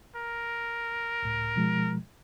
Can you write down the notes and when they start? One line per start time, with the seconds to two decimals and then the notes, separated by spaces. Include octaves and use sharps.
0.16 A#4
1.22 C#2 A2
1.56 B2 F3 G#3